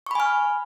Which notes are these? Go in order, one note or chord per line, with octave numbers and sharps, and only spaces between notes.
G#5 B5 C#6 F6